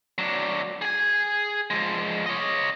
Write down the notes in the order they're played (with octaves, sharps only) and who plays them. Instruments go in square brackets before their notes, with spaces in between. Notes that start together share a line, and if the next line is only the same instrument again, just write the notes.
[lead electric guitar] F#3 D4
G#4 G#5
F3 G#3
C#5 D#5